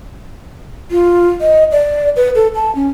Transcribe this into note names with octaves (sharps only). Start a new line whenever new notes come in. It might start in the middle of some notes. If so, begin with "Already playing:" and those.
F4
D#5
D5
B4
A4
A5
C#4